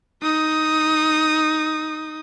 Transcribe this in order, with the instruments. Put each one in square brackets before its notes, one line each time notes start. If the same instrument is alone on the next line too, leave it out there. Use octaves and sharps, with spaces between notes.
[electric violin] D#4 D#6